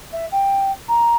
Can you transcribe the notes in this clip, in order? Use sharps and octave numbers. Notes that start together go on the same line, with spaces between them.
E5
G5
A#5